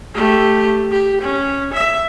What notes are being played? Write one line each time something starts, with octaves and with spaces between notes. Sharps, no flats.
A3 G4
G4
C#4
E5